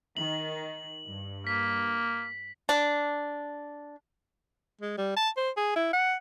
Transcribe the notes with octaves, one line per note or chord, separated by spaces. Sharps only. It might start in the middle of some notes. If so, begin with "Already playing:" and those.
D#3 F#7
G2
A#3 B6
D4
G#3
G3
A5
C5
G#4
E4
F#5